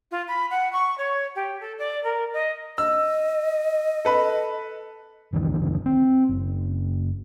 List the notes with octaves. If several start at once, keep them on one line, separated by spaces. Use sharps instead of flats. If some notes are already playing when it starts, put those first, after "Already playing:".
F4
B5
F#5
C#6
C#5
G4
A4
D5
A#4
D#5
D#5 E6
A4 B4 B5
F#1 C#2 D#3 E3
C4
F#1